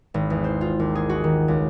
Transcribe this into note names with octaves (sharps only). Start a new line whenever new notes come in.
G#1
E2
C5
F4
D#2
G#4
F#4
D#3
C#2